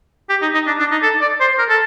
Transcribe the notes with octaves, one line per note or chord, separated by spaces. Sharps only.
G4
D#4
D#4
D4
D4
D#4
A4
D5
C5
A#4
A4